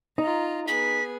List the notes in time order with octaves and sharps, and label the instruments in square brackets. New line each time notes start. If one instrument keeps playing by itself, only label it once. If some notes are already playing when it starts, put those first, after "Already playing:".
[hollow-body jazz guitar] D#4 [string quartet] F4 A#5
[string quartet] B3 G#4 [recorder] B6